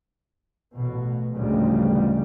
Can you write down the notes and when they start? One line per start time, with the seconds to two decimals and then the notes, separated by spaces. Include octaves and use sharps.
0.76 A1 B2
1.34 A1 D2 C#3 F3 G3 G#3